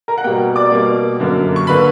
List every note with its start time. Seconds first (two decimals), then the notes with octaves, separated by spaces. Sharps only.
0.08 A#4 A#5
0.18 F#5
0.24 B2 G3 A#3 G5
0.56 D5 D6
0.72 B2 G3 A#3
1.20 F#2 D3 A#3
1.56 C#6
1.67 D3 A#3 B4 B5